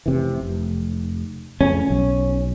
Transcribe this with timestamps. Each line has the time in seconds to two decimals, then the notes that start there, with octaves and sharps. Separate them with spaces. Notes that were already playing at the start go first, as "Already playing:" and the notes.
0.06 F1 C3 E3
0.41 F1
1.61 F2 A2 C#3 C#4
1.90 B1